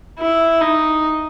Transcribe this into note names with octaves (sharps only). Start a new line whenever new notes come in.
E4
D#4